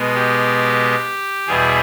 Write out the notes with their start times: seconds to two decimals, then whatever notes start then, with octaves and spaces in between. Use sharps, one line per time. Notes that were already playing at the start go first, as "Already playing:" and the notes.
Already playing: B2 G#3 B3
0.15 G4
1.47 E2 B2 G3 B3 G#4